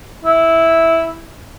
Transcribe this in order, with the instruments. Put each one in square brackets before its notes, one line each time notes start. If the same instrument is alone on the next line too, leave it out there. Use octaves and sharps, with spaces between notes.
[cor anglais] E4